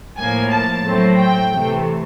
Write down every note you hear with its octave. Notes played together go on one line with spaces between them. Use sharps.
A2 F3 A#3 G#5
A5
A2 F#3 A3 C4
G5
C3 E3 A3